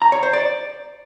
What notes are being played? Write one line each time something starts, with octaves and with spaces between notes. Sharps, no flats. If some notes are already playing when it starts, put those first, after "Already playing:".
A#5
C#5
C5
D5